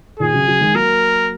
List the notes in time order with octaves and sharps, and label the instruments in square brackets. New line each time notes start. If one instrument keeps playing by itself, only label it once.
[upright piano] A#2 D#3 [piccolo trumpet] G#4
[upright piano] C#3 F#3
C#3 F#3
D#3 G#3
[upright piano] F#3 A#3 [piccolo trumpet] A#4